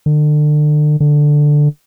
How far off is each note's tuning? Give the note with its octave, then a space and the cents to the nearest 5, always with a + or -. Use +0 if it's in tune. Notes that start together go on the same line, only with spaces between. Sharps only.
D3 +35
D3 +5